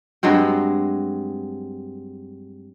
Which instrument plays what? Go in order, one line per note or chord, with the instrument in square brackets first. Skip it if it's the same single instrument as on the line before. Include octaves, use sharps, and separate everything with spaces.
[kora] G2 F#3 G#3 C4